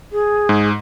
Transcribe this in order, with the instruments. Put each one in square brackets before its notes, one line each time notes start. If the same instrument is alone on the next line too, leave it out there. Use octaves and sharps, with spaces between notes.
[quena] G#4
[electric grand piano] G#2